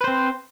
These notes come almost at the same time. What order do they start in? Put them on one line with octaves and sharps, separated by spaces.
B4 C5 C4